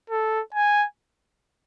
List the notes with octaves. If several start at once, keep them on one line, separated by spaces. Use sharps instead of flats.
A4
G#5